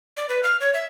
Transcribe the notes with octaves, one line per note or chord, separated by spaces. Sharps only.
D5
B4
F6
C#5
E5